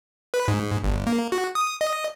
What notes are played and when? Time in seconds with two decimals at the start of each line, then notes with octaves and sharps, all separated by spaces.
0.34 B4
0.48 G#2
0.84 G1
1.07 A#3
1.32 F#4
1.55 D#6
1.81 D#5